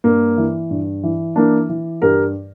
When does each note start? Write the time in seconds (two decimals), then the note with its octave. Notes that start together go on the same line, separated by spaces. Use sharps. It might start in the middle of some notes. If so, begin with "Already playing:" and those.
0.04 G2 A#3
0.37 E3
0.71 G2
1.03 E3
1.36 E3 A#3 D4
1.69 E3
2.02 G2 G4 A#4